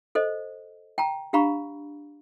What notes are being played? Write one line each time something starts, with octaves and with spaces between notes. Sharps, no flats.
A4 C5 D#5
G5 A5 A#5
D4 G4 F5 A#5 B5 C#6